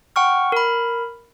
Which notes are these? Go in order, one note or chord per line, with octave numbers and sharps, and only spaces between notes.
F#5 G5 C#6 F6
A#4 B5